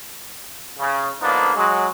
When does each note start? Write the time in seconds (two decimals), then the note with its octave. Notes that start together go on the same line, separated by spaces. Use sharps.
0.79 C#3
1.22 D3 F3 A#3 B3 D4 D#4
1.55 F#3 G#3